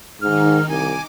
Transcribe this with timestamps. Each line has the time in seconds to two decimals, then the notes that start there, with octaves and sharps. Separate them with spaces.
0.22 G#2 D#3 D#4 F6
0.69 C2 G#5 D6